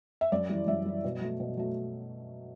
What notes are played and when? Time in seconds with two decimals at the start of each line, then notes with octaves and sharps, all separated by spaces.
0.21 E5
0.32 F#2 D5
0.49 E3 G3
0.67 F#2 E5
0.86 E3 G3
1.04 B2
1.21 F#3 A3
1.40 B2
1.57 F#3 A3